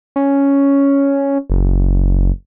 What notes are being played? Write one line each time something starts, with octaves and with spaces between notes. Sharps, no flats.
C#4
F#1